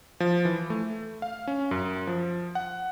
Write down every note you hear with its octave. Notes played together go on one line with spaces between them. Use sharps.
F3
E3
A3
F5
C#4
F#2
F3
F#5